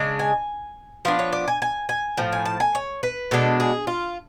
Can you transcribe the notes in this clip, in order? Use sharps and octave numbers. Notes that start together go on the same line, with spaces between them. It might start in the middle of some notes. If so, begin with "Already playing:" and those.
Already playing: C#3 G#3 D4
G#5
F3 B3 D4 F5
C#5
D5
G#5
G#5
G#5
A2 F3
G#5
A5
G#5
C#5
B4
B2 G#3 D4 A4
G#4
F4